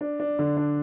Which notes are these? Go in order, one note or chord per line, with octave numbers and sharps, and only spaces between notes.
D4
D4
D3
D4